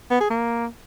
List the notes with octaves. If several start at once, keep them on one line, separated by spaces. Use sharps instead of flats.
B3
G#4
A#3